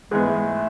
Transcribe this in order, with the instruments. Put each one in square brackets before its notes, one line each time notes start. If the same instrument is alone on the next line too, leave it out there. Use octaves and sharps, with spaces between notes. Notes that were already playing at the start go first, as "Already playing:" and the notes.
[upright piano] G#2 E3 B3 [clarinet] G#3
[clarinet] A3
G#3
A3